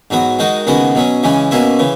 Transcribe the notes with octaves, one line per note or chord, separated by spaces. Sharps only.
G#2 F#3 B3 F#4
D#3 G#3 D#4 F#4
D#2 C#3 G#3 B3 F#4
B2 F#3 C#4
C#3 E3 G#3 C#4
B2 A#3 C#4 E4
C#3 E3